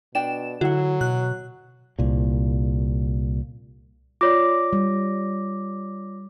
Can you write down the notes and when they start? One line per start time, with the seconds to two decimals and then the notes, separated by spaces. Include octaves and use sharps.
0.15 B2 D4 D5 G5 E7
0.61 D3 F#3 E4 F#4 F#5
1.01 B2 F#6
1.99 C2 A#2
4.21 F4 C#5 D5 D6 A#6
4.73 G3